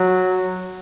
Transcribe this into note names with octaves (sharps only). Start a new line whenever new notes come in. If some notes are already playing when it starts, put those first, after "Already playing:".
Already playing: F#3